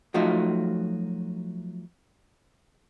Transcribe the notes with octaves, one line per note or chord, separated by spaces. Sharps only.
F3 F#3 A3 D#4 F4 F#4